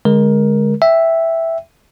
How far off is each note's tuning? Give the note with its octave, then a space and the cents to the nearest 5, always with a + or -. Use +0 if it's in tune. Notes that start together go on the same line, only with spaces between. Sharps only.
D3 +0 G#3 +0 A#4 +15
E5 +0 G5 +0